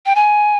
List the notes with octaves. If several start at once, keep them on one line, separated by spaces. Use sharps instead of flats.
G5
G#5